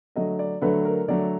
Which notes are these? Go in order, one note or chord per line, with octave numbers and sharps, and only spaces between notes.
D3 F#3 A3 D#5
D5
D3 F#3 A3 B4
A#4
D3 F#3 A3 D5